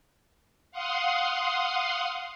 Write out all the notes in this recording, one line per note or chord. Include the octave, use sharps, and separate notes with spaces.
F5 F#5 C6 D#6